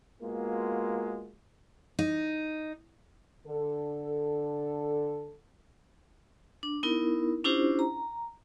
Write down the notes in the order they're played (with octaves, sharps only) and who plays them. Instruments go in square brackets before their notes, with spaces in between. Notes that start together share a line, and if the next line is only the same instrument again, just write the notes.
[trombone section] G#3 A#3 B3 F4 F#4
[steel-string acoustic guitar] D#4
[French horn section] D3 A4
[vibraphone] D4
B3 D#4 E4 A#4
C#4 D4 E4 F4 G4 C5
A#5